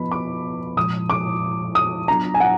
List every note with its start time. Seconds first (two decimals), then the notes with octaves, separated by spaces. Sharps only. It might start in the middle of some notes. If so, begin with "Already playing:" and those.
Already playing: F3 B3 F4 B4 D#5 B5
0.12 D6
0.76 A#2 F3 G#3 D#6
1.10 D6
1.75 D#6
2.08 F#3 B3 D4 F4 A#5
2.34 G#5
2.40 F#5